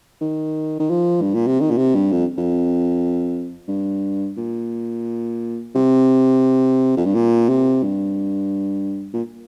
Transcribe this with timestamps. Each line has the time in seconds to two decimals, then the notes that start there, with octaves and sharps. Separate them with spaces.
0.21 D#3
0.80 D#3
0.90 F3
1.22 G2
1.35 A#2
1.47 C3
1.60 D#3
1.71 A#2
1.77 C3
1.95 G2
2.12 F2
2.38 F2
3.68 G2
4.37 A#2
5.75 C3
6.97 F2
7.05 G2
7.15 A#2
7.49 C3
7.83 G2
9.13 A#2